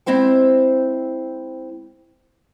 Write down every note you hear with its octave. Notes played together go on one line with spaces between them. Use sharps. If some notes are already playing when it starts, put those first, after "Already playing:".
G#3 C4 E4 C5 G5